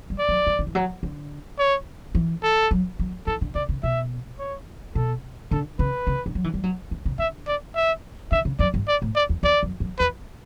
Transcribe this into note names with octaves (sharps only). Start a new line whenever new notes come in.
G3
D5
F#3
G3
D3
E3
F#3
D3
C#5
E3
A4
F#3
F#3
E3 A4
D3
C#3 D5
C#3
B2 E5
C#5
B2 A4
D3 A4
C#3 B4
C#3
D3
F#3
E3
G3
F#3
D3
C#3
D3 E5
D5
E5
D3 E5
C#3
F#2 D5
G2
D5
A2
D5
E2
E2 D5
F#2
F#2
E2 B4